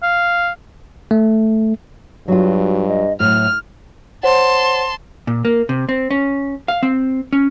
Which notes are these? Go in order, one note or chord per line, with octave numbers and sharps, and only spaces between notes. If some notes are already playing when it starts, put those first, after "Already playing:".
F5
A3
G2 F#3 F4 F#4
D#5
A2 F#3 F6
C5 C#5 F#5 A5 C6
A#2
A#3
C3
C4
C#4
F5
C4
C#4